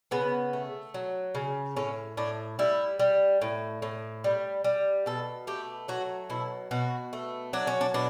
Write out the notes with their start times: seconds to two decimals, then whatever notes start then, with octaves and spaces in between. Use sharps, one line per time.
0.11 C#3 B3
0.53 A3
0.94 F#3
1.35 C#3
1.76 A2 C#4
2.17 A2 D4
2.59 G3 E4
2.99 G3
3.41 A2
3.82 A2
4.24 G3
4.64 G3
5.06 B2 A4
5.47 A3 G4
5.88 F#3 F#4
6.30 B2 E4
6.71 B2 F#4
7.13 A3
7.53 F#3 D4
7.67 C#4
7.81 D4
7.94 B2 D4